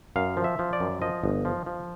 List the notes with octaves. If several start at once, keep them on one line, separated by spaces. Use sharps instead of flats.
F#2 F5
F3
E5
F3
D5
F#2
F3 D#5
G1
F3
F3